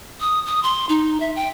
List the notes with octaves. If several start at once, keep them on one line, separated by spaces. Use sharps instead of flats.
D#6
D#6
C6
D#4
E5
G5